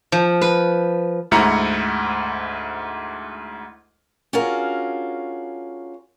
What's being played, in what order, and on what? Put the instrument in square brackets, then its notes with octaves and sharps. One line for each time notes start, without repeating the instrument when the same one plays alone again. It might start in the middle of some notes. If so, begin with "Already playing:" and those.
[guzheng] F3
B4
[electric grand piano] D2 G#2 E4 A#5 C#7
[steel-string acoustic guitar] C#4 D4 F4 F#4 G#4 A#4